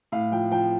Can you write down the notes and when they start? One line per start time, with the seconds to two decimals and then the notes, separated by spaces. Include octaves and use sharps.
0.12 A2 F5
0.32 F3 G5
0.52 F3 G5